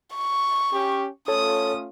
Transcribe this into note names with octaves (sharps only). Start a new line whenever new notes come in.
C#6
C#4 G4
A3 C#4 F4 A4 C#5 A5 D#6